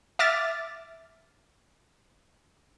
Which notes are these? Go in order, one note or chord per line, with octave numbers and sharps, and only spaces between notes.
E5 D6 F6 A6